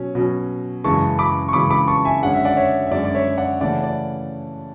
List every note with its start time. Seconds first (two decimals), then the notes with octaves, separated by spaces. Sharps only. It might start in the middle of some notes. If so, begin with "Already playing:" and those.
Already playing: B2 F#3 C#4
0.15 B2 F#3 C#4
0.84 F#2 C#3 E3 G#3 A5 C#6
1.19 B5 D6
1.49 C#6
1.53 F#2 C#3 E3 G#3 B5 D6
1.70 B5 D6
1.88 A5 C#6
2.05 E5 G#5
2.22 F#2 D3 G#3 C#4 F#5
2.34 E5
2.45 D5 F#5
2.57 C#5 E5
2.87 E5
2.91 F#2 D3 G#3 C#4 D5
3.05 D5
3.15 C#5 E5
3.38 D5 F#5
3.61 C#3 E3 A3 C#4 D5 F#5
3.84 D5